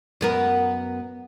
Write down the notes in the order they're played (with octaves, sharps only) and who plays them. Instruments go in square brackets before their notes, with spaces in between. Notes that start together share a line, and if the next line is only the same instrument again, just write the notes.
[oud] F#2 B3 A#4